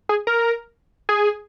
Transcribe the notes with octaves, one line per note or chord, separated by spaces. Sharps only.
G#4
A#4
G#4